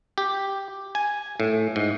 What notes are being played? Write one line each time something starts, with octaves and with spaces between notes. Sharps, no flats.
G4
G#5
A2
G#2